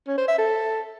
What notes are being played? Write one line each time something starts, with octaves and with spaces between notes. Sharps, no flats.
C#4
C5
E5
A4